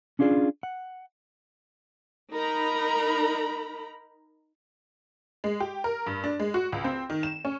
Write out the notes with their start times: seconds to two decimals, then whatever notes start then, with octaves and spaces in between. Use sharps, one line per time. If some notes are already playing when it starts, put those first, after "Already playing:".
0.19 C#4 D4 F4 G#4 D5
0.63 F#5
2.33 D#4 A#4 A#5 B5
5.44 G#3
5.60 G4
5.84 A#4
6.06 G2
6.24 D4
6.40 G#3
6.54 F#4
6.72 C#2
6.84 C4
7.10 D#3
7.23 E7
7.45 C#4